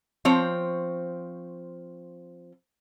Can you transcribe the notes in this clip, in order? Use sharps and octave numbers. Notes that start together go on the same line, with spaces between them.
F3 C4 C#5